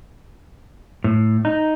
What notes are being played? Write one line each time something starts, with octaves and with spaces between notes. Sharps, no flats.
A2
D#4